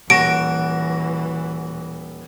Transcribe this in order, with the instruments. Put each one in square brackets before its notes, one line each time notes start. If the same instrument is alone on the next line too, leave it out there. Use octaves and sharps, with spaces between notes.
[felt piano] D#1 A#6 E7 [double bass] E3 [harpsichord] F#4 [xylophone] D7